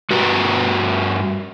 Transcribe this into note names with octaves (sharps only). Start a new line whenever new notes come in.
G2 F#4 G4 B4 A#5